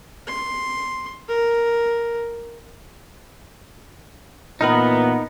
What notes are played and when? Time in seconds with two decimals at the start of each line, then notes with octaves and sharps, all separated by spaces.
0.28 C6
1.29 A#4
4.61 A#2 E3 B3 D#4 A#4 B4